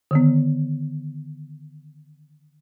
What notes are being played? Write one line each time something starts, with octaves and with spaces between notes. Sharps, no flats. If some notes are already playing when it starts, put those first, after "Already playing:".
D3 D#3 B3